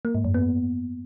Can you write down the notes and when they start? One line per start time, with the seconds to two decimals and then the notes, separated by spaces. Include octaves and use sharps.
0.05 A#3
0.15 G#2
0.25 F#2
0.34 B3